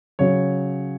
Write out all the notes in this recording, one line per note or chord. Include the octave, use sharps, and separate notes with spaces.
C#3 F#3 C#5